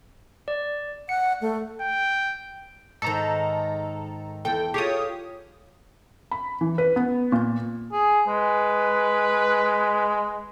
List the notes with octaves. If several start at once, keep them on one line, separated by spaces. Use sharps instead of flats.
D5
F#5 C#7
A3
G5
G#2 D#3 A4 A#5
E2 A4 G5
F4 G4 G#4 C#5 D#6
B5
E3
B4
B3
A#2
G#4
G#3 B4